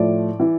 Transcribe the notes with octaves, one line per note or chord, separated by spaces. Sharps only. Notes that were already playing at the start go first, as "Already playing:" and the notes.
Already playing: A2 F3 D5
E3